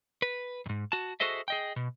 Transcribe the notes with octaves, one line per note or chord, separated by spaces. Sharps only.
B4
F2 G#2
F#4 A5
F#4 G#4 A4 C5 D#5 E5
G#4 D#5 G5
B2